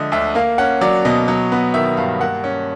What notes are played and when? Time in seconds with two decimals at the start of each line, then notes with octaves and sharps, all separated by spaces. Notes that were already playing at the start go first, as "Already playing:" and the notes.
Already playing: D3 F3 G#3 D#5 E5
0.12 D2 E5
0.35 A#3 F5
0.58 C#4 F#5
0.81 F#3 D5
1.05 B2 D#5
1.28 F#3
1.52 B3
1.74 D#3 E5
1.97 G2 F5
2.21 A#3 F#5
2.44 C#4